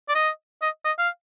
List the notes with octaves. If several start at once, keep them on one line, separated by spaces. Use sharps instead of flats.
D5
D#5
D#5
D#5
F5